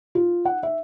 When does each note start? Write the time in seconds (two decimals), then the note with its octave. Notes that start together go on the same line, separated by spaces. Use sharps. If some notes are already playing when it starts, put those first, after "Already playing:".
0.15 F4
0.45 F#5
0.63 E5